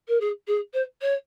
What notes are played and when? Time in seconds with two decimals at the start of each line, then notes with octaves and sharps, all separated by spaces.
0.08 A#4
0.21 G#4
0.47 G#4
0.74 C5
1.02 C#5